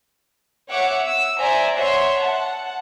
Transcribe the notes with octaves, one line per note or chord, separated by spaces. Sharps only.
C#5 E5 F#5 D6 C#7
E6
C5 D5 E5 G#5 A#5
C#5 E5 F#5 C6
F#5 A5